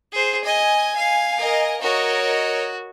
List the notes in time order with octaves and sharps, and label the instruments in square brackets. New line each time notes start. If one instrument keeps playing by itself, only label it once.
[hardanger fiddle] G#4 C5
[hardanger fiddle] D#5 [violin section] G#5
[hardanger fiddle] F5
[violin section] A#4 D#5 G#5
[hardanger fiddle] F#4 [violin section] A#4 C#5 D#5